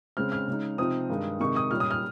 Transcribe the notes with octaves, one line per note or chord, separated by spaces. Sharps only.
C#3 G#3 C4 F6
F6
C#3 G#3 D#4
C3 F3 C4 D#4 D#6
G2 D#3 G#3 D#4
C3 D#3 G#3 D#4 C#6
D#6
A#2 G3 C#4 F6
D#6
F6